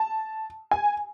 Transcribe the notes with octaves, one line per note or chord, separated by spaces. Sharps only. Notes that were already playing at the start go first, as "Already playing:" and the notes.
Already playing: A5
G#5